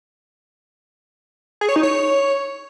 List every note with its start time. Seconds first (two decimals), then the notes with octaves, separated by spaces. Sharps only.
1.61 G#4
1.69 C#5
1.76 D#4
1.83 C#5